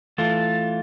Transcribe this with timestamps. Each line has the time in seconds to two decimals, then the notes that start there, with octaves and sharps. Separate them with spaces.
0.18 E3 A3 F4 A6